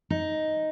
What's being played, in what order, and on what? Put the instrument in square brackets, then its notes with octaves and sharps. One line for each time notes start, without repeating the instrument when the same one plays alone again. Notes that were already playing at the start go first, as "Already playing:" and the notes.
[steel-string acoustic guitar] D#4